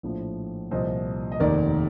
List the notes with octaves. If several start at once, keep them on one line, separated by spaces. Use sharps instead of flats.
A#1 A2 F3
C2 A#2 F3 C5 D#5
D#5
F1 D#2 D#3 A#4 D5